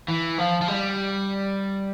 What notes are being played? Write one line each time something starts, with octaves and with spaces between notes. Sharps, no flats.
E3
F3
F3
G3